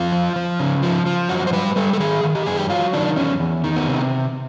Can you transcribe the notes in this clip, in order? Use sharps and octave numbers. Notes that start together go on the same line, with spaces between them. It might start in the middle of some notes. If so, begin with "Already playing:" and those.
Already playing: F2 F4
F3
F3
C#3
F3
F3
F#2 F#4
C5
G3 B4
G3 A4
A4
D#3 G#4
D#3
G4
F#2 G#4
G4
F#3 F4
D#3 D4
E2 C#4
E2
D#3
B3
C3